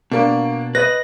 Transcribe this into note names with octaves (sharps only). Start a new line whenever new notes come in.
B2 A#3 D4
B4 D#5 B5 F#6 A#6